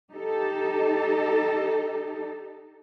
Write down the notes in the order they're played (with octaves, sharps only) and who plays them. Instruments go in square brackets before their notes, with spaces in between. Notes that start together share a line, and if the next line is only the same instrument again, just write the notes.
[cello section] D#4 G4 A4